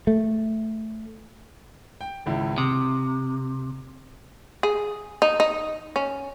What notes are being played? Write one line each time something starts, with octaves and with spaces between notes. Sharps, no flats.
A3
G5
G#1 C#2 E4
C3 D#6
G#4
D#4
D#4
C#4